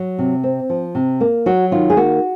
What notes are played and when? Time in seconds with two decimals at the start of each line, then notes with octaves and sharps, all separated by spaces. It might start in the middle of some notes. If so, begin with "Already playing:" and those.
Already playing: F#3
0.18 C3
0.44 C4
0.70 F3
0.95 C3
1.21 A#3
1.46 F#3 F#4
1.71 D#3 F4
1.90 G#4
1.97 A#3 F#4